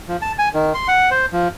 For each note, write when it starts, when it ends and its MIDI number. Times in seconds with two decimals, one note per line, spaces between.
0.08 0.17 53
0.22 0.32 81
0.39 0.49 80
0.54 0.73 51
0.74 0.88 84
0.88 1.10 78
1.11 1.26 72
1.32 1.48 53